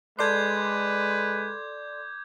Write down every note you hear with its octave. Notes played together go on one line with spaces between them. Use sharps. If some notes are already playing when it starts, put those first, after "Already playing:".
G#3 A4 B4 D5 C6 D6 G6 G#6